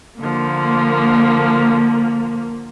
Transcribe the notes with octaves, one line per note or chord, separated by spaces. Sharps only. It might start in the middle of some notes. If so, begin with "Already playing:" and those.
D3 F3 A#3